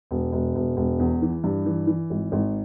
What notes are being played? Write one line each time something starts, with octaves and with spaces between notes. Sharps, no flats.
E1
E1
E1
E1
E2
E3
G2
E3
E3
G#1
G#1